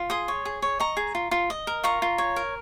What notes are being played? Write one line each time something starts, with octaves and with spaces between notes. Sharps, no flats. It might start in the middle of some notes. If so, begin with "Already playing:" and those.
Already playing: F4
G#4 C6 D#6
C#5
G#4
C#5
D#5 A#5 C#6
G#4
F4
F4
D#5
A#4
F4 A#5 C#6
F4
C#5
A#4